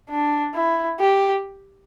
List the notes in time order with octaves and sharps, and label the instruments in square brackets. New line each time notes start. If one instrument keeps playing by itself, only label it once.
[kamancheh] D4
E4
G4